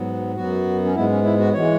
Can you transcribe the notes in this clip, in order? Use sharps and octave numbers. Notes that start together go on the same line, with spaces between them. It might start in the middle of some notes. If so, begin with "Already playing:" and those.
Already playing: G#2 F#3 B3
F#2 F#3 B3 F#4
C#4
G#2 G#3 B3 E4
C#4
E4
F#4
E3 G#3 C#5